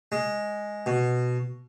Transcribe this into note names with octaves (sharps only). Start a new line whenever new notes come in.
G#3
B2